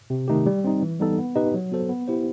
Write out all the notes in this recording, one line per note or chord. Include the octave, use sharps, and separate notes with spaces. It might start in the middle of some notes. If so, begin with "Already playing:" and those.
C3
D#3 A3 D#4 G4
G3
C4 D#4
E3
G3 B3 D#4 A4
B3
D#4 G4 B4 D#5
F#3
B3 F#4 A4 C5
B3
E4 G4 C5